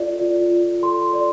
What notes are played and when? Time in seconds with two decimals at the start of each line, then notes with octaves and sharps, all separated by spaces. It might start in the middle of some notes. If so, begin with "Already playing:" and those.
Already playing: F4 A4 D5
0.21 F4
0.52 F4
0.82 A4 C6
1.13 D5